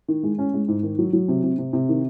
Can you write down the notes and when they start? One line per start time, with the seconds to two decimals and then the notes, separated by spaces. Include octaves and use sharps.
0.08 D#3
0.23 G#3
0.39 C#4
0.54 G#3
0.68 G#2
0.83 D#3
0.99 F#3
1.13 F#3
1.28 C3
1.43 C3
1.58 C3
1.73 C3
1.89 D#3